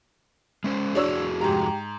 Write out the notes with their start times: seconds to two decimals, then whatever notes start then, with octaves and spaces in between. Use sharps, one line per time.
0.64 G#3 C#4 C5
0.95 F2 D4 F#4 G#4 C#5 E6
1.41 G#2 G4 A#5